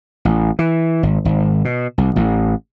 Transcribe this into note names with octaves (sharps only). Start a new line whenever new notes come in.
A1
E3
G#1
G#1
B2
C2
A1